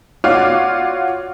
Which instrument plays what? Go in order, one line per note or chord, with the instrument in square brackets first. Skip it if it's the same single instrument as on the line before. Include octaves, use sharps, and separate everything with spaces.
[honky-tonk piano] F4 F#4 C#5 D5 F5 D6